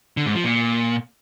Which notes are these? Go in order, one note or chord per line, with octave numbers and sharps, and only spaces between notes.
D3
G#2
F3
A#2